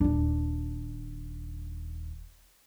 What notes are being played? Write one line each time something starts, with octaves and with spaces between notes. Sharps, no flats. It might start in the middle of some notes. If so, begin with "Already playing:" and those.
D#1 D4